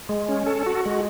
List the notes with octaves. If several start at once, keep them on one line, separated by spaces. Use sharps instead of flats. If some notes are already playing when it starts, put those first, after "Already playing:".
G#3
C#4
A4
F#4
G#3